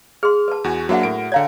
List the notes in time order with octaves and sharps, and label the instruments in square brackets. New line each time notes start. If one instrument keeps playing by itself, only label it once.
[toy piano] G#4 C6 [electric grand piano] F6
[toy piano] B4 A5
[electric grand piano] E2 F#4 G#5
[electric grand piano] F#3 A#3 D4 [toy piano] F#4 E5 F#5
[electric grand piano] A2 A#4 D7
[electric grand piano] D3 A#5 G#6 [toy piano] C#5 F5 G5